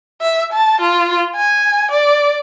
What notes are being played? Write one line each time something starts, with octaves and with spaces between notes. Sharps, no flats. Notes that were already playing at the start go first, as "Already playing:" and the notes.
E5
A5
F4
G#5
D5